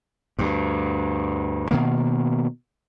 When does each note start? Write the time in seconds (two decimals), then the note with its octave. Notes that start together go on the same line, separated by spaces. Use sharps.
0.39 D2 G2
1.71 B2 D#3 A#3